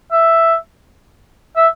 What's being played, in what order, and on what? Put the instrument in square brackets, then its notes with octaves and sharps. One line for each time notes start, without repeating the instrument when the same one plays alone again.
[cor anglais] E5
E5